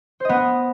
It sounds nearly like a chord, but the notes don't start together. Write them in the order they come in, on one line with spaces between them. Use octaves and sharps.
C5 D#5 B3